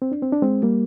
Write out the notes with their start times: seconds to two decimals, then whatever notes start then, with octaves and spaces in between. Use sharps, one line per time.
0.02 C4
0.12 D4
0.22 C4
0.32 D4
0.42 G#3 C4
0.63 G3 A#3